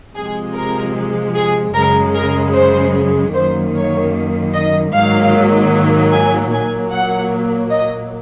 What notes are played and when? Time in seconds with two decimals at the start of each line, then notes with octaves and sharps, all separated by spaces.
0.16 C3 F3 G#3 G#4
0.55 A#4
1.35 G#4
1.74 F#2 C#3 G#3 A#4
2.15 A#4
2.54 C5
3.34 F#2 D#3 A#3 C5
3.74 C#5
4.53 D#5
4.93 G#2 D#3 F#3 A#3 F5
6.12 G#5
6.52 A#2 F#3 A#3 G#5
6.92 F#5
7.71 D#5